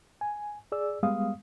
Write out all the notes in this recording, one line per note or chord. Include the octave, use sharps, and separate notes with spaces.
G#5
G#4 D5 E6
G3 G#3 B3 F5 D#6